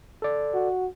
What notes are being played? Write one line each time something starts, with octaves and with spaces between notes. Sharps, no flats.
A4 D5
F#4